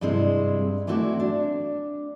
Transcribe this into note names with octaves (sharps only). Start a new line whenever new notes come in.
G2 C3 G#3 C4 E4
E3 A3 C4 E4 F#4 D5
D4